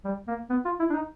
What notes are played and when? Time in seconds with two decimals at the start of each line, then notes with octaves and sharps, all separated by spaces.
0.04 G3
0.27 A#3
0.50 B3
0.65 F4
0.80 E4
0.89 D4
0.94 D#4